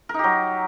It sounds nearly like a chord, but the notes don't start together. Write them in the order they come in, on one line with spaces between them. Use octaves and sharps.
A#4 D#4 G4 F#3